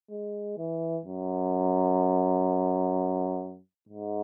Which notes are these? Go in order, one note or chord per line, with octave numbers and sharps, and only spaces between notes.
G#3
E3
F#2
G#2